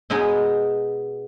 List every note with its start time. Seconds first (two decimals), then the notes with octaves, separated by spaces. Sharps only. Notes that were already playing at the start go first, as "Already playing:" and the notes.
0.10 B2 G#3 B3 D#4 G#4